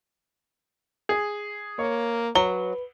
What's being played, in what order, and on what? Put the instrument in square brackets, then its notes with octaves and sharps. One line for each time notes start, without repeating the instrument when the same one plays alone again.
[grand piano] G#4
[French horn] A#3 [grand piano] C#5
[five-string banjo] F#3 [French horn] B4 [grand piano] G7